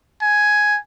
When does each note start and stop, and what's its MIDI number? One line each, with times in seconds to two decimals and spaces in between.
0.22 0.79 80